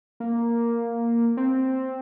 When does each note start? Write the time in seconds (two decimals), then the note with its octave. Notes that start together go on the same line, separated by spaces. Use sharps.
0.20 A#3
1.37 C4